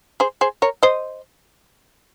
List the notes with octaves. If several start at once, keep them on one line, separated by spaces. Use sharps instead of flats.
G#4 C5
G#4 C5
A#4 C#5
C5 D#5